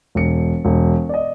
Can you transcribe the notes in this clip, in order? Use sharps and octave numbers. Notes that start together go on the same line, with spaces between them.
E1 C#7
E1
D5 D#5